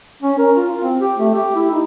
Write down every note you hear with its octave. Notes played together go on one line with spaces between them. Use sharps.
C#4
A#4
F4
F4
C4
G4
A3
G4
E4
D#4